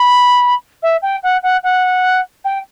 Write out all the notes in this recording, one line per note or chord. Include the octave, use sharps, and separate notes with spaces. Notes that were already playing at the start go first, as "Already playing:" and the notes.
Already playing: B5
E5
G5
F#5
F#5
F#5
G5